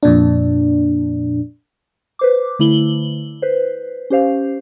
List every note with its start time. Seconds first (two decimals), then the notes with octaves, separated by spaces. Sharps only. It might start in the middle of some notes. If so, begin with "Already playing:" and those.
0.03 F2 A#2 D4
2.19 B4 C5 D6
2.59 D3 A3 E4 F#7 G7
3.42 B4 C5
4.10 C#4 G4 C5 F5